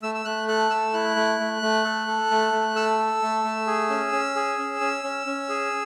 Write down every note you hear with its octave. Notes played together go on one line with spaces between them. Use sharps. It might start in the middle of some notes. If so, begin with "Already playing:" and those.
A3 E6
E6
A3 F#6
A4 F#6
A3 E6
E4 F#6
A3
A3
A3
A4
A4
A3
A3
A4 E6
A4
A3
A3
G#4
C#4
C#4
G#4
C#4
C#4
C#4
C#4
G#4